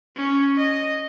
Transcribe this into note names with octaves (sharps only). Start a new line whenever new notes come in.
C#4
D#5